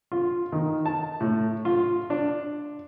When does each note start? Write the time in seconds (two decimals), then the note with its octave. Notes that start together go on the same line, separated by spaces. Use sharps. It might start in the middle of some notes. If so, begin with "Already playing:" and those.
0.12 F4
0.52 D#3
0.86 A5
1.20 A2
1.65 F4
2.10 D4